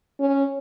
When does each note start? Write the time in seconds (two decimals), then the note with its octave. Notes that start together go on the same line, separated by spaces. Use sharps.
0.20 C#4